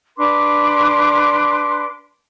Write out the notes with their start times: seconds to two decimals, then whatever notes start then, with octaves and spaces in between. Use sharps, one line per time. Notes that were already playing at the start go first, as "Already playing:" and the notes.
0.17 D4 B4 C6 D6